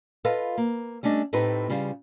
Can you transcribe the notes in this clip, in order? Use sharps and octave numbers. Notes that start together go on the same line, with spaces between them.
F4 A4 B4 D#5 F5
A#3
G3 A3 C#4 D4 D#5
A2 A3 C4 D#4 G4 B4
C#3 G3 F4